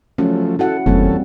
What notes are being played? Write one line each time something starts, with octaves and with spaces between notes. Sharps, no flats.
F3 F#3 A3 C#4
E4 F#4 A4 F#5
F#1 E2 G3 A#3 C4 C#4 A4